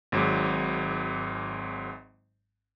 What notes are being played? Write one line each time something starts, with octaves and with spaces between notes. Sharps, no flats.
G#1 G#2 F#3